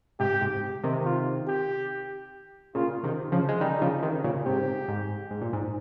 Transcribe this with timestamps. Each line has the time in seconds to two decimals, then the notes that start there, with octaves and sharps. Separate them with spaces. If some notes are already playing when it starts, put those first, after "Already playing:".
0.20 G#2 C3 G4
0.41 G#2 C3
0.84 C3 D#3
1.05 F4
1.48 G4
2.75 A#2 C#3 F4
3.03 C3 D#3
3.32 C#3 F3
3.49 G#3
3.60 D#3 G3 D#4
3.81 C#3 F3
4.03 C3 D#3
4.24 A#2 C#3
4.46 G#2 C3 G4
4.88 G#2
5.31 G#2
5.42 A#2
5.53 G#2